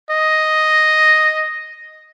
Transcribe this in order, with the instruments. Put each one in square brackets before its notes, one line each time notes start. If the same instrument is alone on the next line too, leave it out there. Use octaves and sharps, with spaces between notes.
[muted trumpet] D#5